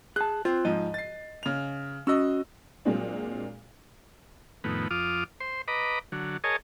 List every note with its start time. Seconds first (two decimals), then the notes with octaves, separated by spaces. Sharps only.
0.16 G#4 A5 F#6
0.45 C4 F4
0.65 G#2 F3 D#5
0.94 A6 C7
1.43 C#3 F7
2.07 C#4 F#4 D#5 E6
2.85 A#2 F#3 G#3 C4 D4
4.64 F2 A2 D#3 B3
4.91 F2 F4 D6 D#6 F6
5.40 C5 C6
5.68 B4 D#5 A#5 B5 D6
6.12 D3 F#3
6.44 G#4 A#4 C#5 D#5 G#5 A5